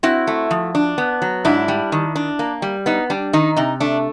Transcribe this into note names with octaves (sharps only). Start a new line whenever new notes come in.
C4 E4 F#4
A3
F3
D4
B3
F#3
G#2 D4 E4
G3
D#3
D4
A#3
G3
B3 D#4
G3 D4
D#3 D#4
C3 D#4
A3 D4